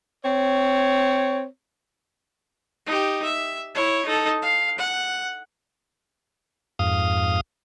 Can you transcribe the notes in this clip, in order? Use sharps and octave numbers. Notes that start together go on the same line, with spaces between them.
C4 C#5
D#4 G4
E5
E4 C#5
D#4 A4
F5
F#5
F2 G#2 F5 D#6